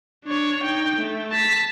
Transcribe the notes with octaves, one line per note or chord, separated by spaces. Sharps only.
D4 C#5
D#4 G5
A3
A5 B6